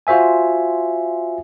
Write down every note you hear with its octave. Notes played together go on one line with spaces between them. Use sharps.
F4 F#4 C5 E5 G#5